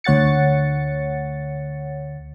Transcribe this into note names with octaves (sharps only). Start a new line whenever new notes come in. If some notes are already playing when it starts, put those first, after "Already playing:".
D2 C#5 F#5 A6 C#7